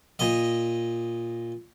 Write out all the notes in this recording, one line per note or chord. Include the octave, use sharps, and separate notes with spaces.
A#2 D#5